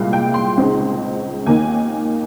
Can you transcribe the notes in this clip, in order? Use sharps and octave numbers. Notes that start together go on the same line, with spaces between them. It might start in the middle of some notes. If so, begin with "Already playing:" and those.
Already playing: C2 A#2 G#3 F5
G5
C6
C#2 C#3 G#3 C4 D#4
D#2 D#3 A#3 G#5